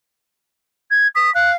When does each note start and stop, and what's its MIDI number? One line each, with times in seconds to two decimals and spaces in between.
0.91 1.08 92
1.15 1.33 87
1.15 1.30 95
1.35 1.56 77
1.35 1.51 90